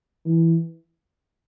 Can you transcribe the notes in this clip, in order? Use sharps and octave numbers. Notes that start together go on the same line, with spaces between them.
E3